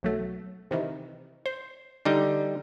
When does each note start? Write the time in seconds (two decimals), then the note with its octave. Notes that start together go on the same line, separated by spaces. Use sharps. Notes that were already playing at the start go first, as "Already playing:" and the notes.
0.03 B1 F#3 A3
0.71 C3 D#3 E3
1.46 C5
2.05 D3 G3 D#4